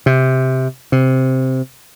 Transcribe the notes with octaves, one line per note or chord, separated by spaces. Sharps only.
C3
C3